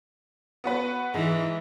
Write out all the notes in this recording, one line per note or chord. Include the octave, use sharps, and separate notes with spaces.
B3 F#4 B4
G#2 E3 G#3